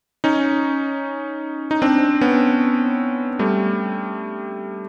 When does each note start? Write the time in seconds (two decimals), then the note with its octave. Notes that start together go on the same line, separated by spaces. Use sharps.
0.24 C#4 D#4
1.71 D#4
1.82 C4 D4
2.21 B3 C#4
3.39 G3 A3